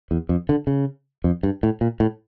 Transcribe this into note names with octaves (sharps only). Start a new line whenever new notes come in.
E2
F2
D3
C#3
F2
G2
A2
A#2
A2